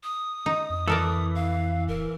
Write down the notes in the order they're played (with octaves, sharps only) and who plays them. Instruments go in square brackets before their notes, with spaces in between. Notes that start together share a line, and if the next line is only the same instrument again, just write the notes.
[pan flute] D#6
[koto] D#4
[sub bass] F2
[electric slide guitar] E3 [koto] A4 A#4 D5
[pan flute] F5
[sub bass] D1 [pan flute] A#4